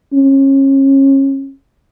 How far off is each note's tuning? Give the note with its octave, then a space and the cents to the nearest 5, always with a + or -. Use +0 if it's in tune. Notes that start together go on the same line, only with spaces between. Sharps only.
C#4 -30